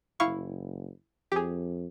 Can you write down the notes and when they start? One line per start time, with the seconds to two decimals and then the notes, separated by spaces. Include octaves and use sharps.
0.20 F#1 E4 F5 C#6
1.32 F2 G4 G#4